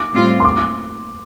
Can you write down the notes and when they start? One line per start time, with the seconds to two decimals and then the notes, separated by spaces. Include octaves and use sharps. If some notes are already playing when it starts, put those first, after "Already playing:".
Already playing: D6
0.13 A2 G3 C4 F4
0.40 C6
0.45 D6